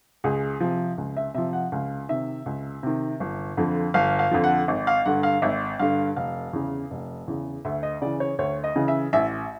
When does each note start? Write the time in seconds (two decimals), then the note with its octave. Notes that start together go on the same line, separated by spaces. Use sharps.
0.24 C#2 G#4
0.60 C3 F3
0.98 C#2
1.17 E5
1.35 C3 F3 E5
1.53 F#5
1.72 C#2 F5
2.09 C3 D#3 E5
2.46 C#2
2.83 C3 D#3
3.20 G1
3.57 F2 D3 F3
3.94 G1 F5
4.19 F5
4.31 F2 D3 F3
4.44 F#5
4.68 G#1
4.87 F5
5.05 G2 D3 F#5
5.23 F5
5.42 G#1 E5
5.79 G2 D3 F5
6.16 F1 F5
6.53 E2 C#3
6.91 F1
7.28 E2 C#3
7.65 D2 E5
7.83 D#5
8.02 C#3 E3 D5
8.20 C#5
8.39 D2 C#5
8.64 D#5
8.76 C#3 E3
8.88 E5
9.13 A1 E5